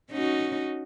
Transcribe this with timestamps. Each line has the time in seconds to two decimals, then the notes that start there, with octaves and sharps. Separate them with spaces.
0.11 C#4 D#4 F#4